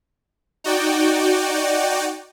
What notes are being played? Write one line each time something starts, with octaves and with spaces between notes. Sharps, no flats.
D#4 F#4 D5 G5